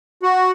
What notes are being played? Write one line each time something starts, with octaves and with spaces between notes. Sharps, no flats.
F#4